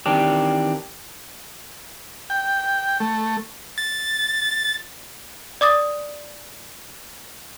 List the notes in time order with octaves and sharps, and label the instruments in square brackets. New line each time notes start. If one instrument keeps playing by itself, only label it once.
[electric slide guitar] D#3 E3 C4 D4 G4
[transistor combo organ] G5
A3
[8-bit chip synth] A6
[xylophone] D5 D6 D#6 A6